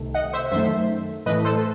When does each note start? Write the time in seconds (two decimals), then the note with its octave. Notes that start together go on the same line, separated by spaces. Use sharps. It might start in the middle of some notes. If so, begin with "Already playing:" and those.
Already playing: C2 C3 D#3 A3
0.14 D#5 F#5
0.33 C5 E5
0.52 F#2 D#3 A3 C5 E5
1.26 A2 E3 A3 B4 D#5
1.45 A4 C5